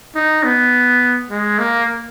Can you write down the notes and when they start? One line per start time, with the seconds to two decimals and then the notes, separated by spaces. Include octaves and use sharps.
0.15 D#4
0.44 B3
1.30 G#3
1.59 A#3